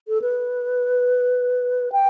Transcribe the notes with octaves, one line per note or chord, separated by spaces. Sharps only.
A4
B4
G5